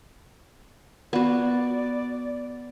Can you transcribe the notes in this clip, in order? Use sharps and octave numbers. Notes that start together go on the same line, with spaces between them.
B3 F#4 D5